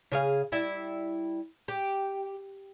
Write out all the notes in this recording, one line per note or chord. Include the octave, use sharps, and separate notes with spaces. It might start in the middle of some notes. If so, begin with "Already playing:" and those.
C#3 G#4 F5
G3 E4
G4